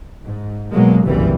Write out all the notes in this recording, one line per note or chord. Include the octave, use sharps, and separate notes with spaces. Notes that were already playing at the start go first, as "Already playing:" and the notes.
G#2
B2 F#3 G#3 A#3
F#1 C2 G2 A#2 E3 G3